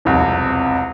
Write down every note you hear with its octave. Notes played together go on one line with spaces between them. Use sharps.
E1 C2 F2